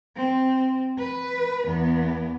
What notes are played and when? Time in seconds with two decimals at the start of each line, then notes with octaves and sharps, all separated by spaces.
0.16 C4
0.98 B4
1.65 E2 B3